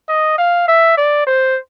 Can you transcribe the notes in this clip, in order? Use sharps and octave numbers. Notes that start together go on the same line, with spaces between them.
D#5
F5
E5
D5
C5